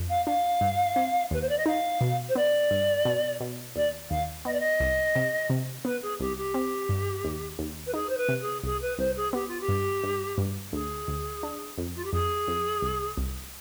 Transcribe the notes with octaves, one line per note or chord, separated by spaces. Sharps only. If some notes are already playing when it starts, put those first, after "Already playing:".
Already playing: F2
F5
D4 F5
G2
C4
D#2 B4
C5
D5
D#5
D#4 F5
B2
C5
B3 D5
G2
B2
B2
D#2 D5
D#2 F5
B3 D#5
D5
D#5
C2
C3
C3
B3 B4
G#4
C2 G4
G4
C4
G2
D#2
D#2
B4
D#4 G#4
C5
B4
C3
G#4
C2 G#4
B4
C2 C5
G#4
B3 G4
F4
G4
G2
G2
G2
D2 G#4
D2
D4
F2
F4
G4
F2 G#4
F2
C2
C2